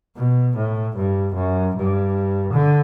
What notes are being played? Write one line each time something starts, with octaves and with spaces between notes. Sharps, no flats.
B2
A2
G2
F#2
G2
D3